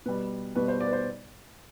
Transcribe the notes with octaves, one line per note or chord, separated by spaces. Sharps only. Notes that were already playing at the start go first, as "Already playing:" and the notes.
B2 G3 B4
B2 G3 B4
C5
D5
B4
C5